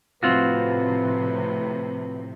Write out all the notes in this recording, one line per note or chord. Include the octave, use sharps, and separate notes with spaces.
A2 C3 F3 C4 F4 F#4 B4